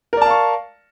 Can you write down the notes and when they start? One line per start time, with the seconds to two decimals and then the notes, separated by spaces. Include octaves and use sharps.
0.13 A#4
0.17 D5
0.21 A5
0.26 F5
0.30 C#6